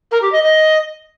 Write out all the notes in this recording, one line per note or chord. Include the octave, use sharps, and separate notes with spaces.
A#4
G4
D#5
D#5